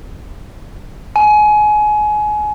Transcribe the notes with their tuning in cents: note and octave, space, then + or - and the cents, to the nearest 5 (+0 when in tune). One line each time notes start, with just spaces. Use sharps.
G#5 +25